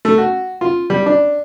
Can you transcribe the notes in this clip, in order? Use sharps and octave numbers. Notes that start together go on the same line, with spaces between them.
A3
F#4
F4
G3
D4